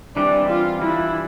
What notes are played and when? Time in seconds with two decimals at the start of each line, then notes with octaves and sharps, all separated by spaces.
0.16 E3 G3 C4 D4
0.49 F4
0.81 E3 G3 D4 E4